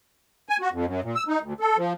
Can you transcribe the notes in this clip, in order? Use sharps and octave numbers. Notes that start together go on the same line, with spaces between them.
G#5
F#4
F2
F#2
A#2
E6
D#4
D2
A4
F3